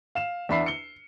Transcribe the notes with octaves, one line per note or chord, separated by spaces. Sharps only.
F5 E7
E2 D4 E5 B5 C7
C#7 G7